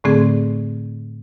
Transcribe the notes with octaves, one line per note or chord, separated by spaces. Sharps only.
A2 D3 A3 C4 G#4